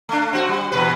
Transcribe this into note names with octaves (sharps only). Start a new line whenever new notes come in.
A3 D4
C4 F#4
G3
E2 A#2 B4